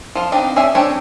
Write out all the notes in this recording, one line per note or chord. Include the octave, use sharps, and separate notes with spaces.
F3 F4
B3 C4 D4 D#4
C#4 G#4 D5 E5 G#5
C4 D4 G4 A4 C#5